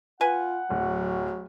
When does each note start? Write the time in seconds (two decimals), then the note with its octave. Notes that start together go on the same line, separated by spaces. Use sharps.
0.21 F4 B4 F#5 G#5
0.70 D1 F#3